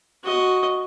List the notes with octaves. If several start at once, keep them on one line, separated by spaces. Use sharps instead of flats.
F#4 D#5